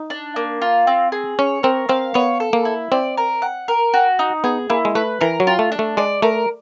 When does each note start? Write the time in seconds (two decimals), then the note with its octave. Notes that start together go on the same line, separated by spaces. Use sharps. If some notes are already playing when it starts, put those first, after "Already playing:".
Already playing: D#4
0.10 D4
0.36 A#3
0.62 F4
0.87 C4
1.12 G#4
1.39 C#4 C#5
1.63 C4 A#4
1.89 C4 F5
2.14 B3 C#5
2.40 A4
2.53 A#3
2.65 E4
2.92 C4 D5
3.17 A#4
3.42 F#5
3.68 A#4
3.94 F#4
4.19 D#4
4.44 B3 G#4
4.70 A#3 E4
4.85 G#3
4.95 A3 B4
5.21 E3 A#4
5.40 F#3
5.47 F4
5.59 A3
5.72 D4
5.79 A3
5.97 G#3 D5
6.22 A3 A#4